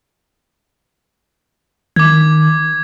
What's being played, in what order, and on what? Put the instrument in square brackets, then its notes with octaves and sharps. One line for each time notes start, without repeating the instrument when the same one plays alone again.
[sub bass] D#3 [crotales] D6 G#6